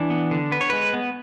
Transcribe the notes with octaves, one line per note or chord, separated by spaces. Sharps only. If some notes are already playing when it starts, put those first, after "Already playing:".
Already playing: E3 D4
B3
D3
B3 B4
C#5
G#3 B4
B3